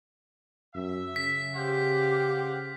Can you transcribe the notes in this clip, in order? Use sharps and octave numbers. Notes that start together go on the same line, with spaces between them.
F#2 E5
C#3 B6
G4 C5 F5 F#5